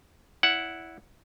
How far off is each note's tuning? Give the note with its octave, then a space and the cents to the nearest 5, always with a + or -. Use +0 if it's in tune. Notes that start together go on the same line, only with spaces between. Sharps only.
E4 -5 D5 -40 F#5 +0